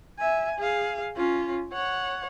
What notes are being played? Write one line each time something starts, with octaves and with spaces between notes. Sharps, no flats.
E5 G#5
G#4 F5
C#4 F4
C#5 F#5